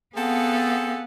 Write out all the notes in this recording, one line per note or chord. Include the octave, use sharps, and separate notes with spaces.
B3 C4 G#4 A4 F5 F#5